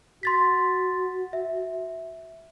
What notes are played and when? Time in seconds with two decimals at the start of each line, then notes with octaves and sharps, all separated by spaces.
0.23 F#4 C6 A6 B6
1.33 E5